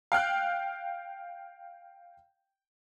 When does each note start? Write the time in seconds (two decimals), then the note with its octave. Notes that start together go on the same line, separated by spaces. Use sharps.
0.12 F5 G5 F6 F#6